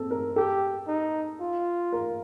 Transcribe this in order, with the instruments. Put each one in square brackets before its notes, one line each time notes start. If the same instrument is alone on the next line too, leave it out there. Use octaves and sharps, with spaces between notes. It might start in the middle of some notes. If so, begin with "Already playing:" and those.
Already playing: [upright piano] C4 A4
A#4
[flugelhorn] G4 [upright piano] A4
[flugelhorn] D#4
F4
[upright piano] A#4